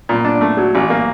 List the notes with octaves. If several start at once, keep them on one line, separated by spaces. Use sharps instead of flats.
A#2
D4
A3
F#3
A1
A#3